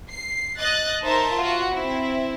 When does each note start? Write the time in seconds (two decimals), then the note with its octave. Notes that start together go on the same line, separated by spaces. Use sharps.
0.12 C7
0.61 D#5 F#6 A6
1.05 D#4 A#4 C5 E5 A5
1.34 F4 F#4
1.73 C4 E4